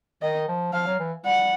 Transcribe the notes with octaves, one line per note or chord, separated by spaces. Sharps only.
D#3 D#5
F3
F3 F5
F#3
E3
G3 F#5